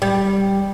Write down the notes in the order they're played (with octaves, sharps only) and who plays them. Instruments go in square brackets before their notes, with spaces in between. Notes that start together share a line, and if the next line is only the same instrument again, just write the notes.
[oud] G3